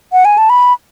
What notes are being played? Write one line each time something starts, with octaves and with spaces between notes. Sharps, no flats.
F#5
G#5
A5
B5